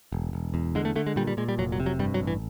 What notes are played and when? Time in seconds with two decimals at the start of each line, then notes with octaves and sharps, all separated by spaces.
0.12 E1
0.33 E1
0.54 E2
0.75 D3 G#3
0.85 A3
0.96 D3 A3
1.07 G#3
1.16 A#2 G3
1.27 G3
1.37 A#2 G#3
1.49 G3
1.58 F1 F#3
1.72 F#3
1.80 C3
1.86 F#3
1.99 G2 G3
2.14 F#3
2.21 A1
2.27 E3